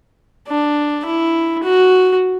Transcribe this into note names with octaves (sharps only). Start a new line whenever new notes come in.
D4
E4
F#4